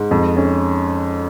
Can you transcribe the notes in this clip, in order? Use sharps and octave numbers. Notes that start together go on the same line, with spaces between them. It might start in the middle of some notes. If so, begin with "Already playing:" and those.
Already playing: G#2
F2
C#4